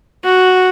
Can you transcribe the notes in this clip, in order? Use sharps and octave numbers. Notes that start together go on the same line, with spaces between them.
F#4